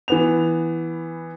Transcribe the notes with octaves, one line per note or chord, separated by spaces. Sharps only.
E3 B3 F7